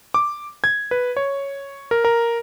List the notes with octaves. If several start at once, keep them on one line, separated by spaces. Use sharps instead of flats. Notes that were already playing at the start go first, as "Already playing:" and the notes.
D6
G#6
B4
C#5
A#4
A#4